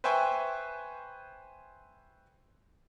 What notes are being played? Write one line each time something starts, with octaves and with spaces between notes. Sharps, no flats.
B4 C5 E5 G5 G#5 C#6